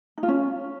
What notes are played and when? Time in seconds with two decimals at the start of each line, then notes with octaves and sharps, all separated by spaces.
0.18 D#4
0.23 F4
0.28 C#4